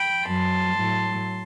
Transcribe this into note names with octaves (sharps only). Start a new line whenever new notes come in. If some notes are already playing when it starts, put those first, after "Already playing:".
Already playing: G5 B5
F#2 F#3 A5 C6
A2 F#3